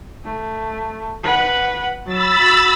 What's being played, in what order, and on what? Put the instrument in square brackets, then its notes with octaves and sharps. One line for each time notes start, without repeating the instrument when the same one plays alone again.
[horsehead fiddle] A3
B4 F#5
[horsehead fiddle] F#3 [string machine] B5 E6 A6
[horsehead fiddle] F#4